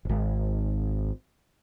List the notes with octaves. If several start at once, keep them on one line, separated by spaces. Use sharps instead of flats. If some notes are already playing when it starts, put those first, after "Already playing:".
D#1 G#1